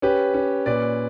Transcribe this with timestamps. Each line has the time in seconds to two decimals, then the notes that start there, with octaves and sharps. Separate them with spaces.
0.02 C#4 G4 B4
0.34 C#4
0.66 A#2 B4 D5